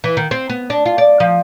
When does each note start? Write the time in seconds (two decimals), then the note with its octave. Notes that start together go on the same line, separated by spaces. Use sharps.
0.04 E3
0.17 D#3
0.31 C4
0.49 B3
0.70 D4
0.86 F4
0.98 D5
1.20 F3